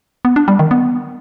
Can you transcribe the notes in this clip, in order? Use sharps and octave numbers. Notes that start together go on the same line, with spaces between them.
B3
D4
G3
D#3
B3